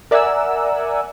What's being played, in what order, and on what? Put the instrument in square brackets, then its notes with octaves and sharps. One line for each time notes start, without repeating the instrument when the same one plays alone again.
[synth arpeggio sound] A#4 D5 E5 F#5 G#5 E6